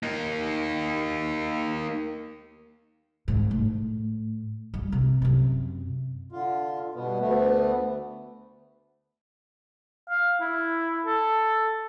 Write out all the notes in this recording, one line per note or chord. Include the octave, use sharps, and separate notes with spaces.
A#3 D#4
G#1 G#2
A2
G2
C3
F#2 C3
D3 F4
G2 B2 B3
D2 A3 B3
F5
E4
A4